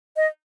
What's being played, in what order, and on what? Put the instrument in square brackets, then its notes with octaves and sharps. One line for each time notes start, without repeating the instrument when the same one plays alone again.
[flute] D#5